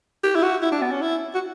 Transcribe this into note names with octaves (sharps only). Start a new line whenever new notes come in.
G4
E4
F#4
E4
D4
B3
C#4
E4
F#4